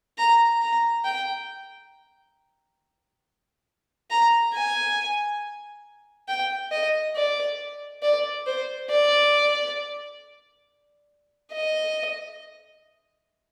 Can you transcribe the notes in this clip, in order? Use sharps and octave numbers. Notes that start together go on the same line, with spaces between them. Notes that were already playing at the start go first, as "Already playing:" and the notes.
A#5
A#5
G5
A#5
G#5
G5
D#5
D5
D5
C5
D5
D#5